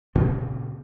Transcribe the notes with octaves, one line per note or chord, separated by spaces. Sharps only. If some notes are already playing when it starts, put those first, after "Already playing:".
D2 A#2 C#3 C4